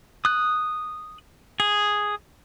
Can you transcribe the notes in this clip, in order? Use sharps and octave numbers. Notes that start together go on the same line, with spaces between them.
D#6 F#6
G#4